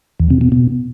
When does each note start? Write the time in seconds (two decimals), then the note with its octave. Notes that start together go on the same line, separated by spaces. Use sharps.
0.20 E2
0.30 C3
0.41 B2
0.52 B2